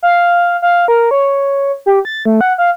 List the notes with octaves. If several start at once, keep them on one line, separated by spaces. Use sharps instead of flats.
F5
F5
A#4
C#5
G4
A6
A3
F#5
F5